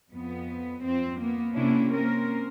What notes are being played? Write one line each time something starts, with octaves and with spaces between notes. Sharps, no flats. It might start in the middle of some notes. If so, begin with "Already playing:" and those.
F2 B3
F2 C4
A#3 B3
C3 A#3 C#4 D4 E4
A#3 C4 C#4 A#4